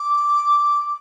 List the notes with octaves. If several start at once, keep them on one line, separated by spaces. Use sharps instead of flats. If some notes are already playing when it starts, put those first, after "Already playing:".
Already playing: D6